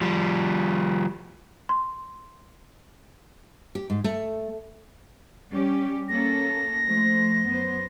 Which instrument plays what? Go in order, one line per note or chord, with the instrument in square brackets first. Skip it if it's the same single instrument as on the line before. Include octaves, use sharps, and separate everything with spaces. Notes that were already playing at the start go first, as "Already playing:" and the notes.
[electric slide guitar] F3 G3
[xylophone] C6
[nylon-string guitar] G4
G#2
A3
[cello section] G3 C#4 G4
[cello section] A#3 C#4 A4 [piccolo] A#6
[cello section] F3 A3 C5
F#2 B3 C5